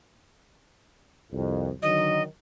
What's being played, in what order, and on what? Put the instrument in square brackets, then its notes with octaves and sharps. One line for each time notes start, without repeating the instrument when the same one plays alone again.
[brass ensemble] C2 F2
[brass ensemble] D3 D#3 F#3 [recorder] D#5